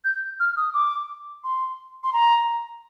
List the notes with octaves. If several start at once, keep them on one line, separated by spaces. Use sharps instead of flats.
G6
F6
D#6
D6
C6
C6
A#5